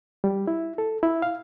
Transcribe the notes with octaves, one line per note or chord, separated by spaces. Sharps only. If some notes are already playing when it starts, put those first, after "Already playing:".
G3
E4
A4
E4
F5